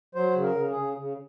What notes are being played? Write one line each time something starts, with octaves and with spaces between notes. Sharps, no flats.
F#3 C5
C#3
A#4
C#3
G#4
C#3
C#3